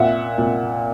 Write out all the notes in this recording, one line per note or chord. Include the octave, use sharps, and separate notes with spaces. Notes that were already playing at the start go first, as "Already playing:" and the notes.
Already playing: A#2 E5 F#5
A#2